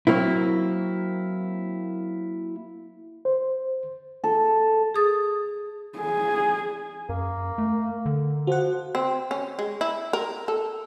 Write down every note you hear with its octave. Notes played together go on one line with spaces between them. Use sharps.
F#3 A#3 C4 E4
C5
A4
G#4 D#6 A6
G#4
F#2 A#3
A3
D3
F3 F#4 F#5
C4
C#4
G#3
E4
A#4
A4